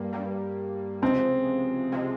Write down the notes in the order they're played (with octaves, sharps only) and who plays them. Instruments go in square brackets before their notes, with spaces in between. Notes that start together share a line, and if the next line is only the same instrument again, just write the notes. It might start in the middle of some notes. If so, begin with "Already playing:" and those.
Already playing: [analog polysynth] G2 G3 A#3
G2 G3 A#3
[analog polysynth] C#2 C3 F3 G#3 [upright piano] C4
[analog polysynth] C3 F3 G#3